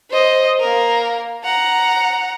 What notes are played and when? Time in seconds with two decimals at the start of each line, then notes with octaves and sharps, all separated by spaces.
0.10 C5 D#5
0.60 A#3 A#4
1.45 F#5 A#5